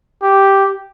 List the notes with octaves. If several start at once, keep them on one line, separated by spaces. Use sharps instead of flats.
G4